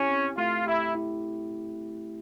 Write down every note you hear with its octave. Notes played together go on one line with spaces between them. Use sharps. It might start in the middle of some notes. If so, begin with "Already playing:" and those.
Already playing: C#4 E4 G4
C4
A3 F4
E4 G4
E4